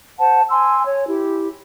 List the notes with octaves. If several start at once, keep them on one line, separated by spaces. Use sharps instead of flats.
C5 F#5 A5
G#5 C6 E6
C#5
E4 G4